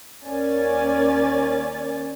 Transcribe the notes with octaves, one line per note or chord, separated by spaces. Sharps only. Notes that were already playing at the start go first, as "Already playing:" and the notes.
D#2 A#3 C#4 D5 G#5 A6